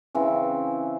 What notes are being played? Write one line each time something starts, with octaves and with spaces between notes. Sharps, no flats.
C#3 E3 C4